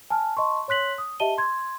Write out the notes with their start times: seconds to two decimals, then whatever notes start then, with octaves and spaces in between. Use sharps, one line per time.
0.10 G#5 A5 F6
0.37 D#5 A5 C6 C#6
0.68 C#5 C6 F#6 B6 F#7
0.98 D#6
1.20 G4 D#5 E5 A5 D#7 G7
1.38 C6 G#6